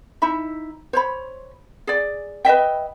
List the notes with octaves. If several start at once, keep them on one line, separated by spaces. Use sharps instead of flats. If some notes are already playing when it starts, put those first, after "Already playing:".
D#4 E4 E5 B5
C5 C#5 B5
G#4 D5
B4 D#5 E5 G5